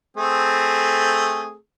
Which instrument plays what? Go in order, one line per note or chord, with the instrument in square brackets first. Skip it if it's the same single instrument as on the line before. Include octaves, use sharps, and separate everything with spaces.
[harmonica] A3 C4 G#4